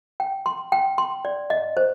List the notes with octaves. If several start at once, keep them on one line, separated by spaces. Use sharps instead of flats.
G5
C6
G5
C6
D5
D#5
C5